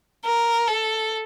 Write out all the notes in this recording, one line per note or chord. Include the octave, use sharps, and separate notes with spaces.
A#4
A4